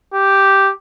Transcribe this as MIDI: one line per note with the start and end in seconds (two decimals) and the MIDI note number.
0.14 0.72 67